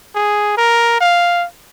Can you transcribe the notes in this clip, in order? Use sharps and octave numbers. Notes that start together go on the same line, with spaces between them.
G#4
A#4
F5